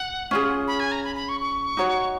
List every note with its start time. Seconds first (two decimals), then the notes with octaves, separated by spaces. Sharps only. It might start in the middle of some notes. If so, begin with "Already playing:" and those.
Already playing: F#5
0.31 C#4 F4 G#4
0.67 B5
0.80 G#5
0.92 A#5
1.04 B5
1.16 B5
1.29 C#6
1.40 C#6
1.77 D#4 F#4 C#5